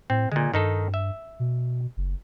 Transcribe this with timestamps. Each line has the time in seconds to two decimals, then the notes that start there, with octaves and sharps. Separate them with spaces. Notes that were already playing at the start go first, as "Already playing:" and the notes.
0.10 A2 C4
0.32 A#2 D3 G#3
0.54 G2 D#3 D#4 A4
0.94 E5
1.40 B2
1.97 F#1